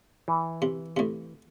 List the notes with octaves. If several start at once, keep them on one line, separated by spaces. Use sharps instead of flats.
E3
C3
A2 C3